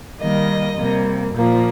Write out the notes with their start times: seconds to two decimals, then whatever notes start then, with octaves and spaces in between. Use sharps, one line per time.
0.20 D#3 G3 A#3 D#5
0.78 C3 G3 A#3
1.34 A#2 F3 A#3